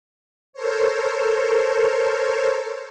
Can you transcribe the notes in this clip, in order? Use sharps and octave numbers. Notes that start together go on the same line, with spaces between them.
A4 A#4 C5 C#5